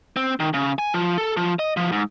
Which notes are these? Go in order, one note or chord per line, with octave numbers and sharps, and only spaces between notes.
C4
D#3
C#3
G#5
F3
A4
F3
D#5
F3
G#2